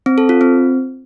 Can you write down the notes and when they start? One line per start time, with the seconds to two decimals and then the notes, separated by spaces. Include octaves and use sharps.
0.06 C4
0.18 A4
0.29 F4
0.41 C4